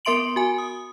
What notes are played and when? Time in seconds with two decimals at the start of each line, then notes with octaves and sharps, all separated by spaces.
0.05 B3 A#4 E5 C6 D7 F#7
0.36 F#4 G#5
0.58 D#6